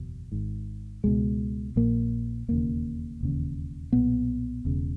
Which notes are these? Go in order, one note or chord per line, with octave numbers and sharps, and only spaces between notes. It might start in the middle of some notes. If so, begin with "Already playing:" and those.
Already playing: F#1 E2 B2
G#1 G#2
C#2 B2 G#3
A#1 A#2 A#3
E1 D#2 C#3 A#3
E1 D#2 C#3
B1 A#2 B3
E1 E2 C#3